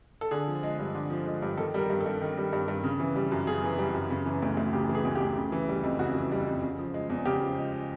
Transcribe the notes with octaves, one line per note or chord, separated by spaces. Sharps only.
A4
D3 G#4
F3
G#3
G2
D3
F3
G#3
G2
D#3 A4
G3 A#4
G2
A4
G2
D#3
G3
G2
G2
C#3
E3
G3
F#2
C#3 G#4
E3
G3
F#2
C#3
E3
D2
D2
C#3 G4
E3
G#4
D2
D2 G4
C#3
E3
G3
F2
C#3 F#4
E3
G3
F2
C#3
F3
G#3
E2
C#3 G4
F3
G#3